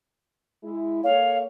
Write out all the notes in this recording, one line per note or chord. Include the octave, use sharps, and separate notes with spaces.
G#3 E4
A#3 A4 C#5 F5